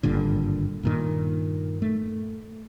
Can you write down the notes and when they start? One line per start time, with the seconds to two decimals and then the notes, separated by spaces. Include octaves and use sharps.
0.03 G#1 G2 A#2 D3
0.83 G2 A#2 D#3
1.82 A3